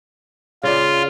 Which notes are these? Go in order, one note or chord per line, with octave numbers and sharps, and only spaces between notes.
C#3 F4 D5